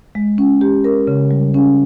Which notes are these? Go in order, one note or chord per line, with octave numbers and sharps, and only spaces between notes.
G#3
C#4
G4
A#4
C#3
G3
C#4